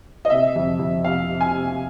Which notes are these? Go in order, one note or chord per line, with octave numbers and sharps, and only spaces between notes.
D#5
C3 E5
F2
F2
C3 F5
C3
G#5
C3